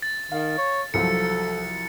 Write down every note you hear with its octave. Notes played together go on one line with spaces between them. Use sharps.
A6
D#3 F5
C#5
C2 F3 F#3 A4 C#7